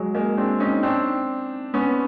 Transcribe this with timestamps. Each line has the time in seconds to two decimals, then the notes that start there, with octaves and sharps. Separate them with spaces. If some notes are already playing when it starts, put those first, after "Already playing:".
Already playing: F#3 G#3
0.15 G#3 A#3
0.37 C4 D4
0.60 C#4 D#4
0.83 C4 D4
1.74 B3 C#4